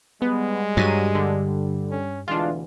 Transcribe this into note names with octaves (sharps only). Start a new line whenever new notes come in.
G3 G#3 B3
G2 F#3 D#7
D3
C#4
D2 B2 E3 G#3 D4 F4